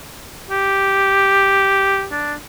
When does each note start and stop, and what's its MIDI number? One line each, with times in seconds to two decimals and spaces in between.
0.50 2.06 67
2.12 2.34 62